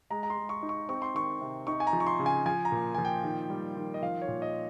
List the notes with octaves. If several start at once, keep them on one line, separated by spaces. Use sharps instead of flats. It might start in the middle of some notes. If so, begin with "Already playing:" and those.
G#3 A#5
A#5
C6
G#3
C#6
D#4
C#6
C4 C#6
C6
D#3 C#6
C3
D#4 C#6
G#5
A#5
F3
C#6
C6
C#3
G#5
F3 G#5
A#5
A#2
F3 G#5
G5
D#3
G3
D#3
D#5
F3 F5
C#5
A#2
D#5